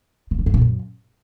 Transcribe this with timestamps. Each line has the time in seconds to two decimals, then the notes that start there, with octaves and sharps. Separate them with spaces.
0.31 C#3
0.39 D#3
0.46 G2
0.54 B2
0.61 F#2